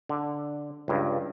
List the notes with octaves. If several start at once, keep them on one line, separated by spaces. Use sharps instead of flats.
D3
C#2 G2